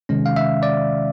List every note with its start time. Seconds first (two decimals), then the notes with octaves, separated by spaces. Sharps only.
0.09 C3 D#3 G#3 C#4
0.26 F5
0.36 E5
0.63 D5